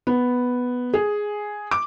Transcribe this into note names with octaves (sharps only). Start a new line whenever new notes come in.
B3
G#4
D6